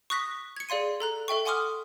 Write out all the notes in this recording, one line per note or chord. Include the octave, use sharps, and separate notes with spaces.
C#6 D#6 F#6 A#6 B6
G#6 C#7
G#4 D5 F5 C6 D#7
A4 A#5 F#6
A4 E5 G5 C#6
F#5 G#5 C6 D6 D#6 F6